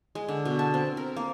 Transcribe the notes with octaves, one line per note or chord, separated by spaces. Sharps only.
G#3
D3
B2
A5
C4
A#4
A#3